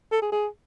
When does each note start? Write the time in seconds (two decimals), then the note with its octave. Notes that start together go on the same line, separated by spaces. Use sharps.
0.12 A4
0.22 G#4
0.32 G#4